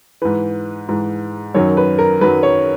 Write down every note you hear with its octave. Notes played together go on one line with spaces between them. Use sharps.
G#2 E3 B4
G#2 E3
F#2 D#3 F#3 C#5
B4
A#4
F#2 D#3 F#3 B4
C#5